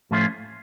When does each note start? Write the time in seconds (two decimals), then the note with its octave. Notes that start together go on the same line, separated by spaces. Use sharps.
0.11 A2 F3 A3 C#4 F4